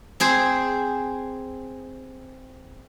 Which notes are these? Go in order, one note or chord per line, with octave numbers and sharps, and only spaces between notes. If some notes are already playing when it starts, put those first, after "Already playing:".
C4 G#4 C5